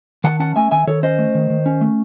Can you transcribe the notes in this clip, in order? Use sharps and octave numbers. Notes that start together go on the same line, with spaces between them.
D#3 F#5 A5
C#4 F#5 A5
A3 E5 G#5
D#3 E5 G#5
D#3 A4 C#5
C#4 C5 D#5
A3
D#3
D#3
C#4
A3